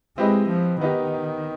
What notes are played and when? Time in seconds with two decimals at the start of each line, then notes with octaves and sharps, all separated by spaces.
0.18 G#3 C4 E4 G4 B4 D#5
0.49 F3
0.80 D#3 B3 D#4 G4